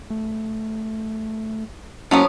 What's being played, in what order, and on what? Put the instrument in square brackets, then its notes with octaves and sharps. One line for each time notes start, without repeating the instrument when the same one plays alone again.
[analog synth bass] A3
[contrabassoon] F#2 [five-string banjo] F3 F#3 B3 [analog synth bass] A#3